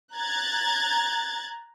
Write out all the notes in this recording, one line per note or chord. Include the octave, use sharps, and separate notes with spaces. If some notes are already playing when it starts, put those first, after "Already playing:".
A#5 F#6 G#6 A6